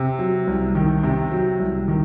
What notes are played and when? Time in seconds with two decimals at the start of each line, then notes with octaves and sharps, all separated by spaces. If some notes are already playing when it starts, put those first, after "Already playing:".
Already playing: C3
0.19 F#3
0.47 C2
0.75 D#3
1.03 C3
1.32 F#3
1.60 C2
1.88 D#3